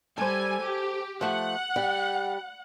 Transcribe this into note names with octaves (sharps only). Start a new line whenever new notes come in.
G3 A4 C5 G#5
G4
F3 A3 F#5
G3